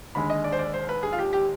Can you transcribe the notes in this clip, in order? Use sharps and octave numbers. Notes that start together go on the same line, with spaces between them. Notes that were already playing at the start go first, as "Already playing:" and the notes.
D#2 D3 G#3 B5
D#5
D5
C5
D5
C5
B4
G#4
F4
G4
G4